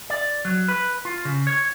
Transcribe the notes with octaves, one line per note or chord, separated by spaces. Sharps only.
D5
F#3
B4
F4
C#3
C#5